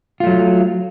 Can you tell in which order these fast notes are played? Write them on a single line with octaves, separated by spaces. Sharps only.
F4 A3 F#3